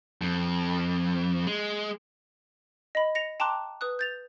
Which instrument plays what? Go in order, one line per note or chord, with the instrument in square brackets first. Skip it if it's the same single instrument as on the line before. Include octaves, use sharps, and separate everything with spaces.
[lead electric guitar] F2
G#3
[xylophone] D#5 B5
A#6 C#7 F7
G5 A5 A#5 C6 D6 F#6
B4 D#6 F#6
G6 A6 F7